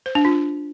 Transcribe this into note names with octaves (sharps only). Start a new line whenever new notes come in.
C5
D4
F4